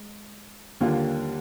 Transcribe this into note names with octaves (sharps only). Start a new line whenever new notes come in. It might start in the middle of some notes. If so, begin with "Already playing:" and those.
Already playing: G#3
D#2 D3 G3 A#3 F4